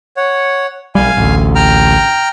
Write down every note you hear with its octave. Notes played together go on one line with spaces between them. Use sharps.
C#5 F#5
B1 G3 F5 G#5
A1 D2
G5 A#5 F6